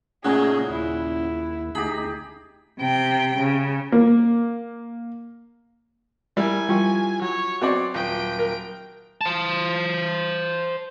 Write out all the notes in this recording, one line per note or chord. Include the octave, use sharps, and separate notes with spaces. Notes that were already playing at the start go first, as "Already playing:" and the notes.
A#2 C#3 A3 C#4 D#4 G#4 F#5
D#2 E4
D2 D#4 G4 G#4 B5
C3 G5
C#3
A#3
G3 E4 A#4 G#5
F3 G3 C#6
F#3 C#5
B3 C4 F#4 D5
D#1 G5 D7
A#4
C5 A5